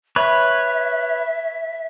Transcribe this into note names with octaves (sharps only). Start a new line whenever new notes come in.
B4 C#5 E5